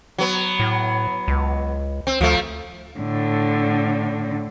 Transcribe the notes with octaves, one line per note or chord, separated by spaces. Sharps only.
F#3 B3
A2
C#2
C4
D2 F3 A3
A2 D3